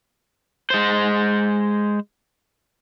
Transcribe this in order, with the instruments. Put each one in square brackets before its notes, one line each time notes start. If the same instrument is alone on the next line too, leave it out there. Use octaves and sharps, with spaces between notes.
[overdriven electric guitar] G#3 C5